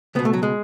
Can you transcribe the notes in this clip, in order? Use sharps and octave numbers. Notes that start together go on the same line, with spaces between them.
C#2 B2 B3
A3
F#3
G#3